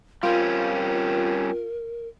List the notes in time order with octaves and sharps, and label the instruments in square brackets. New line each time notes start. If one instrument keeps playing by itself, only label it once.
[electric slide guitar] G3 C4 C#4 [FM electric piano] F4 [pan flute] A#4